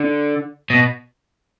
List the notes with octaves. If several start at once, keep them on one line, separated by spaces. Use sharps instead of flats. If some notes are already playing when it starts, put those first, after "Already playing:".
Already playing: D3
B2